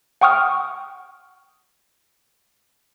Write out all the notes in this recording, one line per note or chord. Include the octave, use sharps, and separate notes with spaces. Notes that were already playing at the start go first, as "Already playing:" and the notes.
F#5 G5 C#6 D#6 F6